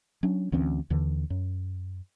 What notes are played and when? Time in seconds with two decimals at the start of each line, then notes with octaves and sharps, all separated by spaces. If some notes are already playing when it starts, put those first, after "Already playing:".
0.23 F#3 C#4 D4
0.52 D2 E3 C4 C#4
0.90 D#2 D3 E3
1.30 F#2